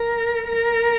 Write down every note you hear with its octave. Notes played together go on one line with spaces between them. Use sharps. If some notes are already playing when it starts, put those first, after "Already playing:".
Already playing: A#4
A#4